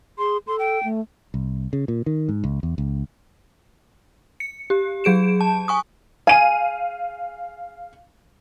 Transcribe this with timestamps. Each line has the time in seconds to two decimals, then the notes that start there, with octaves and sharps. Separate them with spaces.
0.18 G#4 C6
0.47 A4 C6
0.59 G5
0.83 A3
1.34 C2
1.73 C#3
1.88 A#2
2.06 D#3
2.29 G#2
2.44 C#2
2.63 E2
2.78 C#2
4.40 C#7
4.70 G4
5.04 F#3 G#4 D7 E7
5.41 A5
5.68 G#5 C#6 D#6
6.27 G#4 F5 G#5 D#7